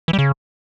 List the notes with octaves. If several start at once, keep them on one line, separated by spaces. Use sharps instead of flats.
E3
G3
C#3